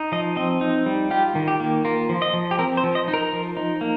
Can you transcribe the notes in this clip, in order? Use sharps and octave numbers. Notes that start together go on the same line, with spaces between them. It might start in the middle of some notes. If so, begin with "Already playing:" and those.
Already playing: D#4
F3 D#5
C4 D#5
D#4
G3
F4 G4
D#3
G4
A#3
F4 A#4
F3
D#5
F3
G4
C4 A#4
C5
F3
D#5
D#4
A#4
F3
D#4
A#3